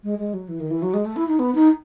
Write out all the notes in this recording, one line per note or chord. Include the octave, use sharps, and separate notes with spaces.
G#3
G#3
F#3
E3
D#3
E3
F#3
G#3
A3
E4
D#4
B3
D#4